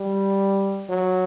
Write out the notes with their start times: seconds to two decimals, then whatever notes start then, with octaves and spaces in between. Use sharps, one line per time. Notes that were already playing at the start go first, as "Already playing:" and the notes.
Already playing: G3
0.89 F#3